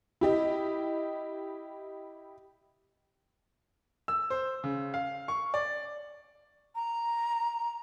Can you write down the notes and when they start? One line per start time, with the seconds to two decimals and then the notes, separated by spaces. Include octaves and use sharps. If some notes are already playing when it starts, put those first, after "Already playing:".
0.21 E4 G4 D#5
4.08 E6
4.30 C5
4.64 C#3
4.94 F5
5.28 C#6
5.54 D5
6.75 A#5